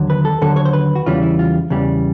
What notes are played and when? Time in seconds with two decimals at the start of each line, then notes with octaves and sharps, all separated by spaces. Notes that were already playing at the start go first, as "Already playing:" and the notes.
Already playing: D#2 D3 F#3
0.10 B4
0.25 A4
0.42 D#2 D3 F#3 A4
0.56 C#5
0.65 C5
0.73 B4
0.95 F#4
1.06 E2 C#3 E3 G3 F4
1.22 E4
1.39 F4
1.70 E2 C#3 E3 G3